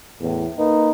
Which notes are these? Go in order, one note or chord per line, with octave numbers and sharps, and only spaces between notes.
E2 A2
A#3 D#4 B4